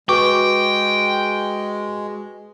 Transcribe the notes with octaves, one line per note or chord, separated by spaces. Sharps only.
G#3 F#4 B4 G5 C#6 D6